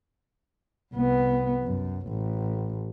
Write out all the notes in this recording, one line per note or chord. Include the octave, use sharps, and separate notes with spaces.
C2 B3
F#2
A1